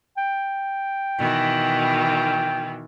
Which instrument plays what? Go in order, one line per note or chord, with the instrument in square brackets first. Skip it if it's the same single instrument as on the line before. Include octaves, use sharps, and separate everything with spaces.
[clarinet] G5
[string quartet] B2 D#3 E3